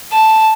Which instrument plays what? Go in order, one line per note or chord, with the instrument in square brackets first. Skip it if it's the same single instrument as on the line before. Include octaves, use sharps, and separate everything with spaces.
[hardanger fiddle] A5